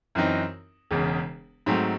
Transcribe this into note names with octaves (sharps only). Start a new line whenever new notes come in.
F#2 E3 C4 D#4
E1 E2 C#3
G#2 F#3 A3 C4